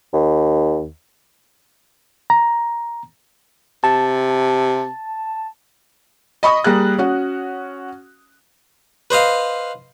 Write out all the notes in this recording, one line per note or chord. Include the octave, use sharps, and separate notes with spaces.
D#2
A#5
C3 A5
D#5 B5 C#6 D#6 A#6
G3 A#3 G#4 F#6
C#4 F#4
B4 C5 D#5 F5